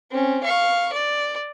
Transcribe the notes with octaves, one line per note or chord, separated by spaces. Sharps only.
C4 C#4
F5 C#6
D5